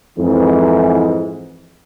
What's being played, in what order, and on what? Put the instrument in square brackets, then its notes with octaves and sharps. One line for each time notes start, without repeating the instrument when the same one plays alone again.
[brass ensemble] F2 G#2 E3